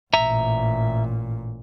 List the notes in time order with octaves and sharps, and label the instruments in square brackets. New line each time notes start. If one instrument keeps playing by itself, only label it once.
[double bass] A1 A#2 [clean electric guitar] E5 A#5